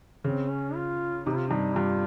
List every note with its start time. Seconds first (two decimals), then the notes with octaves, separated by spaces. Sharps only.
0.24 C#3 C4
0.50 C#4
0.75 F4
1.26 C3 D#4
1.36 F4
1.47 G2 D#4
1.76 G2 F4